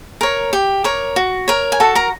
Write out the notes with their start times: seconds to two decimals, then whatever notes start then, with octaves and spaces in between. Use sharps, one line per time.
0.21 A#4 C#5
0.53 G4
0.84 A#4 C#5
1.16 F#4
1.48 A#4 C#5
1.72 G#5
1.80 F#4 A4 A5
1.95 A#4 A#5